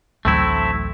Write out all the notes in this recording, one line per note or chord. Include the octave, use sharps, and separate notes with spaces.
A1 D2 F#3 A3 C4 E4